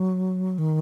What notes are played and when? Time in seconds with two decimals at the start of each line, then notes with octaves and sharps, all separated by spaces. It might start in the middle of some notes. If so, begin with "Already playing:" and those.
Already playing: F#3
0.58 D#3